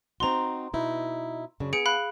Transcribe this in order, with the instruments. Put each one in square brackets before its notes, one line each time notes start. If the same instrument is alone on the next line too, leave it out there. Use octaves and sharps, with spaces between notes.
[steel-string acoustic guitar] C4 D#4 F#4 [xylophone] A#5 C6
[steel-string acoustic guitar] B2 D#4 E4
F#2 C#3 D4
[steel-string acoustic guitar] B3 G#5 [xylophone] G#4 C#7 D7
[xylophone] F5 B5 F#6